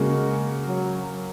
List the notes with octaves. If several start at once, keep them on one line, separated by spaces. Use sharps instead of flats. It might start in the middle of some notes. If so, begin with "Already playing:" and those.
Already playing: C#3 G#3 A#3 F#4
F#3